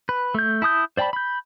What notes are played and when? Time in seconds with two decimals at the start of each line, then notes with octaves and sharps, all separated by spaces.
0.09 B4
0.34 A3 G6
0.62 E4 A5 D#6 G6
0.97 C5 D5 G5 A5 B5
1.13 B5 G6